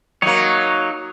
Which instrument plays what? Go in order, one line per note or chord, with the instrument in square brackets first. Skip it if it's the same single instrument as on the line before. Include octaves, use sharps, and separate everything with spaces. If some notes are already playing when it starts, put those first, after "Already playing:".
[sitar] F#3 A#3 [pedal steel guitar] D#4 C#5